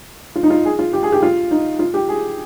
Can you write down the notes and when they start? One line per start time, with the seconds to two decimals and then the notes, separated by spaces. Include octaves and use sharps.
0.36 F4
0.43 D#4
0.50 F4
0.65 G#4
0.79 F4
0.93 G4
1.03 G#4
1.12 G4
1.22 F4
1.51 D#4
1.79 F4
1.94 G4
2.09 G#4